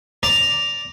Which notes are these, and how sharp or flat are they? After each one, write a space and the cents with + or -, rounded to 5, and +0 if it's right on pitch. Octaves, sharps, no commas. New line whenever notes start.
D5 +0 A#5 +0